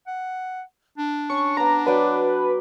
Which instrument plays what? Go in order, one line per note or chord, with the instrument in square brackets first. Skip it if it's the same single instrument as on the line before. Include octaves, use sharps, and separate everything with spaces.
[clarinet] F#5
D4
[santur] C#4 [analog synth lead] C#6
[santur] B3 D6 [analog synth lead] A#5
[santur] F#3 D5 G5 [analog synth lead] B4